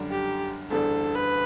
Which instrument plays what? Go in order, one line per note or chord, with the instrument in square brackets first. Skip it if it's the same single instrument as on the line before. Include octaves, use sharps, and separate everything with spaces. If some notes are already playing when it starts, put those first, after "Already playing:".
Already playing: [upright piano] F#2 D3 G3 D4
[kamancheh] G4
[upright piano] F#1 E2 D3 G3 D4 [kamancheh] A4
[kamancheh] B4